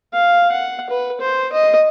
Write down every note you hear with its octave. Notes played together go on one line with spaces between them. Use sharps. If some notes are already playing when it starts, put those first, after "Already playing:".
F5
F#5
B4
C5
D#5